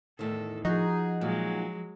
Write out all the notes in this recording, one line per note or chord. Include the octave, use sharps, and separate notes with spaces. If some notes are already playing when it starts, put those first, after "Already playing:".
E2 A2 D#3 A4
F3 D#4 F#4 G#4
A#2 F#3 G#3